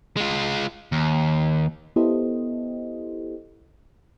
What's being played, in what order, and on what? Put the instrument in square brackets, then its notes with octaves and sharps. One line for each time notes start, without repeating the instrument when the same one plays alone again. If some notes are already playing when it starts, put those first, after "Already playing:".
[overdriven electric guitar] G#3 F4
D#2
[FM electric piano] B3 E4 G4 A4 C5 D#5